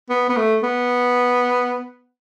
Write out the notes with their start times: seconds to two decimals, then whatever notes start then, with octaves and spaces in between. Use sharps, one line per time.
0.10 B3
0.29 B3
0.37 A3
0.63 B3